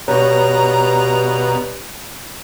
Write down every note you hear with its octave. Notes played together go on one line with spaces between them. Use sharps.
G2 B2 G4 C#5 A#5